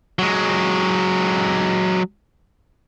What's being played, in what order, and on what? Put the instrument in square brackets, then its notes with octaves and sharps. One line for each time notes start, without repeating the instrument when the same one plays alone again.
[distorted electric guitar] F#3 G#3